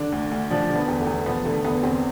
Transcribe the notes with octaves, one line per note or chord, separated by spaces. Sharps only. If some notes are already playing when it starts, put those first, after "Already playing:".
Already playing: D3 D4
D2
D2
F3 D4
D3
B3
E2
A3
E2
F3 B3
D3 A3
E2 B3
E2 C4